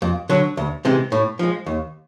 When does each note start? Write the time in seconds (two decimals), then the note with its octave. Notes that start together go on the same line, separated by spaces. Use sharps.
0.02 F2
0.29 D3 F#3
0.57 D2
0.85 C3 E3 G#3
1.12 A2
1.39 F3 G#3
1.66 D#2